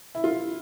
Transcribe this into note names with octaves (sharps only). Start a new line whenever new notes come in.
E4
F4